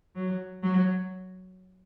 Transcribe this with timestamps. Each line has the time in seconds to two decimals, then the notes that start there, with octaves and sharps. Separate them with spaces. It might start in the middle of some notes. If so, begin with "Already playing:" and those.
0.16 F#3
0.63 F#3